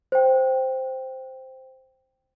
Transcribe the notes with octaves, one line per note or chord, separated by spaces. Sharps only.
C5 G5